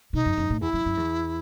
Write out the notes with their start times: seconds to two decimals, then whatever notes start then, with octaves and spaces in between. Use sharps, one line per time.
0.13 B2 D#4
0.26 F#2
0.38 F#2
0.50 A2
0.61 E2 E4
0.73 F#2
0.85 F#2
0.97 E2